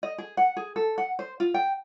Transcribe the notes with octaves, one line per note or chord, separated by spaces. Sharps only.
D#5
G#4
F#5
G#4
A4
F#5
C5
F4
G5